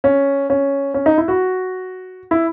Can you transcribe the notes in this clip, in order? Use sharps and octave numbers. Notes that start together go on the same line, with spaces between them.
C#4
C#4
C#4
D#4
E4
F#4
E4